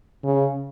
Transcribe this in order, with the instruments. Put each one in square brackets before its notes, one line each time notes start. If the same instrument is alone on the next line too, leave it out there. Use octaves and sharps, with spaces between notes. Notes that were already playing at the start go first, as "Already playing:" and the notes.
[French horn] C#3